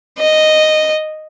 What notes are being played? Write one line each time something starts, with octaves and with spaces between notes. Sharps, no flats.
D#5